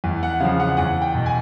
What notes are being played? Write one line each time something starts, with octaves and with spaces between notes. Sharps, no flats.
E2
F#5
C#3 F3 F5
F#5
E2 F#5
G5
B2
G#5